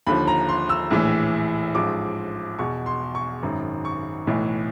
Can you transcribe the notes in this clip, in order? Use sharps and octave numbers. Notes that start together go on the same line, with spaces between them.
D#2 D3 F3 B5
A#5
C6
E6
A#1 A2 E3
A1 G#2 F3 D6
E2 B2 C#6
C6
C#6
G#1 F#2 D#3
C#6
B1 A2 E3